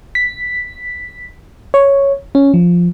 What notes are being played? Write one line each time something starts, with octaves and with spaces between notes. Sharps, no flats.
B6
C#5
C#4
F3